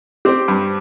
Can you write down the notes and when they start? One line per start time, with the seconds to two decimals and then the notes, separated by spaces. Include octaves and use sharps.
0.25 C4 G4
0.48 G2